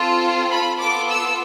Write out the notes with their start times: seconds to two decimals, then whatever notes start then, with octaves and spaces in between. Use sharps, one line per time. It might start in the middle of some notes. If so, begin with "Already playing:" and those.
Already playing: C4 F4 A4
0.51 B5
0.80 B3 F4 A4 D6
1.09 E6